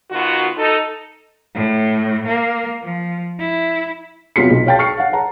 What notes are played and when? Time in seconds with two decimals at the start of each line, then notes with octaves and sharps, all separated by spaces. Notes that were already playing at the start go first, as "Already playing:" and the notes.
0.11 D#3 B3 F4 F#4
0.57 D#4 A4
1.55 A2
2.27 A#3
2.82 F3
3.39 E4
4.36 C3 F#3 B3 F4 B6 C#7
4.50 B1
4.66 C#5 F5 G5 A5 A6
4.79 C#6 F6 C7 C#7
4.97 F5 F#5
5.13 F#5 A5 A#5